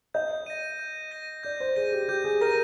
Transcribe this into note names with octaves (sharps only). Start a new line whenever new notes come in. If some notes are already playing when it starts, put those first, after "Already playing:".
D#5 G6
A#6 D#7
G6
A#6 D#7
D5 G6
C5
G#4 A#6 D#7
G4
G4 G6
G#4
A#4 A#6 D#7